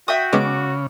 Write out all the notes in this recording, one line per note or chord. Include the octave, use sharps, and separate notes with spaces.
F#4 E5 G5 D#6
C#3 G#3 B3 C#4 D6